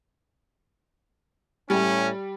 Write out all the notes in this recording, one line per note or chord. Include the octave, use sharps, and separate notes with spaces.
A2 G3 C#4